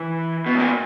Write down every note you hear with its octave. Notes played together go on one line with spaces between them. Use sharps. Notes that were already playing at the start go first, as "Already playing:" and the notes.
Already playing: E3
B2
G#2
A#2